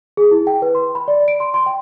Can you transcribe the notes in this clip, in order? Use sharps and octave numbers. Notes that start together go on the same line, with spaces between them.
G#4
E4
G5
B4
C6
B5
D5
D7
C6
C6
G5